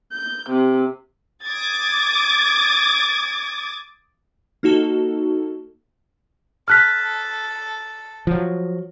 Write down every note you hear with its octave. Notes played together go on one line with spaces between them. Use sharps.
G6
C3
D6 D#6 G#6 A6
A#3 D#4 F#4 A4
A4 F6 F#6 B6
F3 F#3